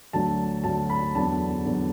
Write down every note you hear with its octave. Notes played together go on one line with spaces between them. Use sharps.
D2 D3 F#3 A5
D2 D3 F#3 A5
B5
E2 D3 F#3 A5
E2 D3 F#3